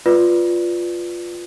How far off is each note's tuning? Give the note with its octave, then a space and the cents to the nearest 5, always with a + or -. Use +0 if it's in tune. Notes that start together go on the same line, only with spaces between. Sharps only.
F4 +0 B4 +0 D5 +0